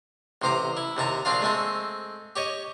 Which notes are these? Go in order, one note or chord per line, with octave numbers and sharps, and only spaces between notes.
A1 C3 C5 A#5 D6
E4
D#2 C3 A5 A#5
A#1 C4 D4 F4 F5
G#3 A3 C4 A4
G4 C#5 D#5